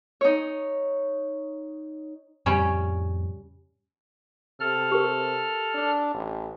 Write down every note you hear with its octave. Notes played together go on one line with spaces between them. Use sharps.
D#4 C#5
F2 A2 C#3 G3 C#4
C3 A4 F6
G4 A#4
D4
A1